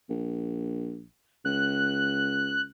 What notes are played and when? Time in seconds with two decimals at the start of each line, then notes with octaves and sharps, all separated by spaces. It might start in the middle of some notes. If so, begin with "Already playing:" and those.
0.09 A#1
1.45 C#2 F#6